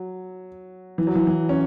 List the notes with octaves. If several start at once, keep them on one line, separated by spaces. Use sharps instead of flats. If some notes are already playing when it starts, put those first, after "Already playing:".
Already playing: F#3
E3
F#3
E3
E3
C#4